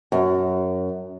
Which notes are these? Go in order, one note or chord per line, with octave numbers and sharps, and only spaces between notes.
F#2